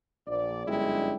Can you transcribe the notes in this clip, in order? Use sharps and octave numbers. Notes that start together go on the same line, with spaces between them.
A#1 D5
G1 F#2 G#3 D4 E4 G5